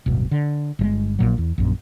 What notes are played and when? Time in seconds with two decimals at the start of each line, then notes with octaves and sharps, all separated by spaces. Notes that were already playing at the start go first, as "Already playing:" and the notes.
0.06 D1 G1 B2
0.31 D3
0.79 G1 D#3 G#3
1.19 A#1 A#2 F#3
1.38 E2
1.58 A#1 F#2